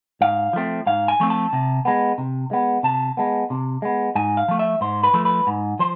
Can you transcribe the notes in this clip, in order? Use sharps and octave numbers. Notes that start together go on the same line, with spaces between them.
G#2 F5
F3 A3 C4
G#2 F5
G#5
F3 A3 C4
A5
C3
G#3 B3
C3
G#3 B3
C3 A5
G#3 B3
C3
G#3 B3
G#2 G#5
F5
F3 A3
E5
G#2 C5
B4
F3 A3
B4
G#2
F3 C5